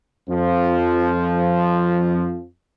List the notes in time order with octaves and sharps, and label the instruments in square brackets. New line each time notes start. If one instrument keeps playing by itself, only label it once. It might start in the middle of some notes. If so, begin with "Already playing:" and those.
[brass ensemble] F2 F3